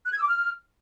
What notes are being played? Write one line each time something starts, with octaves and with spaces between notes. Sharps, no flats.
F#6
G#6
E6
D6
F6